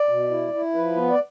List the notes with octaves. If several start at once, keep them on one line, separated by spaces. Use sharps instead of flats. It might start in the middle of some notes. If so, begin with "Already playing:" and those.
Already playing: D5
B2
E4
E4
F3 B4
B3
D5